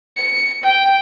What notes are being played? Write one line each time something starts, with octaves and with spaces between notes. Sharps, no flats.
C#7
G5